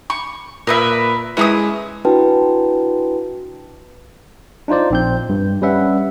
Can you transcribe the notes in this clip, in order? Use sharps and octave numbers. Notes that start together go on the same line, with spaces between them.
C#6
A#2 A#4 B4 E5 D#6
G#3 C#4 E4 B4 A#5 D#6
D4 E4 F#4 B4 G5 A5
D4 D#4 F4 C5 D5
A#1 C4 G6
G2
G3 C#4 B4 E5 F#5